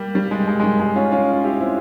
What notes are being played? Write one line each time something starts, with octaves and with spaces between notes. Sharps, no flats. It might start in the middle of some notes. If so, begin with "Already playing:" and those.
Already playing: G3 A#3
G3
G#3
G#3
G#3
G3
G#3
C#4 F4
C#4 F4
E4 G4
C4 E4